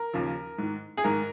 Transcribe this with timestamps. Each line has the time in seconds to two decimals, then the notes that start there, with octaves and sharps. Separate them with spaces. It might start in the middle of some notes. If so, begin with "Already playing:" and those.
Already playing: A#4
0.13 D#2 C#3 F3
0.58 G#2 D#3
0.97 G#4
1.04 G#2 D#3 A#4